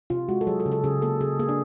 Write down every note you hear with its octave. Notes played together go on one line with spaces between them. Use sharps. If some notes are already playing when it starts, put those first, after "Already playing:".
C3 F4
G#3 F#4
A4
F#3 G#4
A4
C#3
A4
C#3 G#4
A#3 A4
C#3 G#4
A#3 G#4
D4